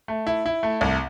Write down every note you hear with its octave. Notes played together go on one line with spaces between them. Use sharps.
A3
E4
E4
A3
C2